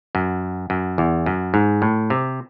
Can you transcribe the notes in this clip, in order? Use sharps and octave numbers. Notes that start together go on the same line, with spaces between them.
F#2
F#2
E2
F#2
G#2
A2
C3